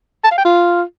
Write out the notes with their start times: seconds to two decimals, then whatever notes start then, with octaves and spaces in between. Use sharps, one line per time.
0.24 A5
0.31 F5
0.38 G5
0.45 F4